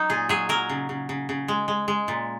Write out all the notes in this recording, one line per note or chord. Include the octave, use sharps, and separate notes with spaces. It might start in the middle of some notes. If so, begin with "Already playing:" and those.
Already playing: F#3 D#4
A#2 G#4
F#3 G#4
F#3 A#4
C#3
C#3
C#3
C#3
G#3
G#3
G#3
A#2